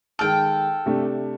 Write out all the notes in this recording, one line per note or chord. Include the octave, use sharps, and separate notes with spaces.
D#3 G#3 A4 G5 F6
C3 A3 D4